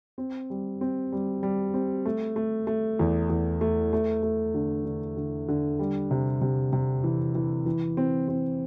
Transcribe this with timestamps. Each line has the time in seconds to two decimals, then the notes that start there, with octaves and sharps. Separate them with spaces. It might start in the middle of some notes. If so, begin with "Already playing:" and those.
0.18 C4
0.50 G3
0.81 C4
1.12 G3
1.43 G3
1.74 C4
2.06 A3
2.36 A3
2.67 A3
2.99 E2
3.30 E2
3.61 A3
3.93 A3
4.23 A3
4.54 D3
4.85 D3
5.17 D3
5.48 D3
5.79 G3
6.11 C3
6.41 C3
6.73 C3
7.04 E3
7.35 E3
7.66 E3
7.97 C4
8.28 C4